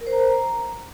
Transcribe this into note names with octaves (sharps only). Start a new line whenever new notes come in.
A#4
C5
A#5